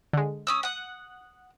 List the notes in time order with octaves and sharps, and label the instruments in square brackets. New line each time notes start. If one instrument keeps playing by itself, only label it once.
[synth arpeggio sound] D3 G#3
[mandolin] C#4 D#6 E6
F#5 D#6